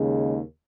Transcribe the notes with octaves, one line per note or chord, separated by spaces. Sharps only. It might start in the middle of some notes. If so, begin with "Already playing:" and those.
Already playing: D#2 C#3 G#3